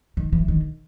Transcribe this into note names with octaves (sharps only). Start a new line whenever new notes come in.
D#3
E3
D#3